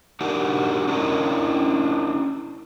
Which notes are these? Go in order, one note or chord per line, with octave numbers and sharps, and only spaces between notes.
D4 D#4 F#4 G4 A#4
C#4 D4 E4 A#4 D#5